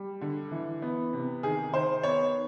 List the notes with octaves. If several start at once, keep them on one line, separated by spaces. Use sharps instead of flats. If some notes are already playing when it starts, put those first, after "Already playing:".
Already playing: G3
D3
E3
B3
C3
D#3 G#4
D#3 C5
B3 C#5